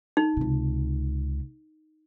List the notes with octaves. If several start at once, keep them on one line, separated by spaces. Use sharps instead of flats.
D#4
C#2 C3